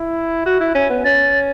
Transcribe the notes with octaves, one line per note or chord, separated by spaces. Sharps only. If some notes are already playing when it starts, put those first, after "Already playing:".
Already playing: E4
F#4
E4
C#4
B3
C#4 A6